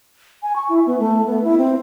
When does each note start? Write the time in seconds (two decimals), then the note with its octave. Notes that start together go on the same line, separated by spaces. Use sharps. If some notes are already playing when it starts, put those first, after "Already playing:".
0.43 G#5
0.56 C#6
0.69 E4
0.87 B3
0.99 A3
1.27 B3
1.44 E4
1.58 C4